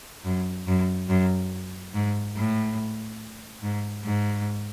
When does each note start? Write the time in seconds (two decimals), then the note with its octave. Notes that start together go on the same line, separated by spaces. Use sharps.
0.25 F#2
0.67 F#2
1.09 F#2
1.94 G#2
2.36 A2
3.62 G#2
4.04 G#2